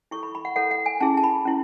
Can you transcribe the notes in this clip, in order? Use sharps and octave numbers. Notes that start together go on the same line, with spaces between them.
E4 A4 C#5 C#6
B5
B5
F#5
E4 A4 C#5 F#5
F#5
G#5
C#4 E4 G#4 A5
A5
B5
C#4 E4